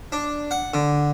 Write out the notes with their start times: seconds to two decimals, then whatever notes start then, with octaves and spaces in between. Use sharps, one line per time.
0.12 D4
0.51 F#5
0.74 D3